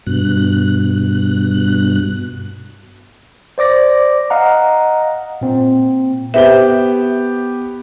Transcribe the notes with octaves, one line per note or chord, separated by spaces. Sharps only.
G2 B2 F#6
C5 D5 D6 A#6
D#5 F5 F#5 A#5
A#2 C4
B3 G4 C5 E5 G7